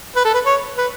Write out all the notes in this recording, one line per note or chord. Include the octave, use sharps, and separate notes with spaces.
B4
A4
B4
C#5
B4